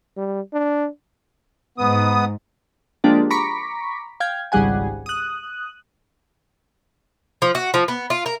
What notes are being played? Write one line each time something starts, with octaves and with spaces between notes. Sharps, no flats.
G3
D4
G#2 B3 D#6
F3 G#3 A#3 D4 G4 D5
A#5 B5 C#6 D6 B6
F5 G5 G#6
G#1 C#2 G3 G#4 F#5 G#5
D#6 F#6
F3
F#4
F3
B3
F4
A#4